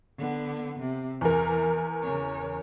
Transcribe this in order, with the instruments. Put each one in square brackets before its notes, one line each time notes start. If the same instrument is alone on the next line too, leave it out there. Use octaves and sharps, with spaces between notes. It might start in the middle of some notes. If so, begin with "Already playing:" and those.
[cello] D3 B3
C3
[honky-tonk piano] E2 A#4 [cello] E3
[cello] C#3 C#5